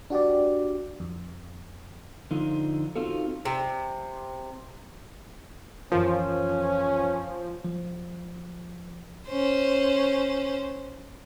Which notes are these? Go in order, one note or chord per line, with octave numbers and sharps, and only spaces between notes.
D4 F#4 G4 D5
F2
D3 F3 D#4 F4
C4 D#4 F4 F#4 A4
C3
F#2 E3 F3 C#4 A#4
F3
C#4 C5